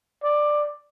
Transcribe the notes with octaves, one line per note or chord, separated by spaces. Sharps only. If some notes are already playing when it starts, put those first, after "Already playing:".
D5